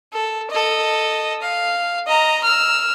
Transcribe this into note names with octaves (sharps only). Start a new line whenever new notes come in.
A4
A4 D#5
F5
D#5 A#5
E6 F6